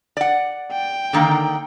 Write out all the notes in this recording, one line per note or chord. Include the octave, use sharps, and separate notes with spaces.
D5 F#5
G5
D3 D#3 A#3